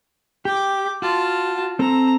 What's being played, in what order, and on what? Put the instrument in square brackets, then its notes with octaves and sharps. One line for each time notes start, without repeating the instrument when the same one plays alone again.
[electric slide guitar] G4 [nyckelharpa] G5 D6
[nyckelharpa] F4 A5 [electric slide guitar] F#4
[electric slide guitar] C4 A4 [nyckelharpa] A#5